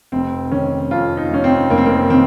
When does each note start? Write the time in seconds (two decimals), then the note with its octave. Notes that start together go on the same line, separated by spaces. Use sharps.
0.12 F1 C4
0.51 D#3 C#4
0.91 F2 F4
1.17 D#4
1.30 F1 C#4
1.44 C4
1.70 F1 A#3
1.78 C4
1.85 A#3
2.10 D#3 C4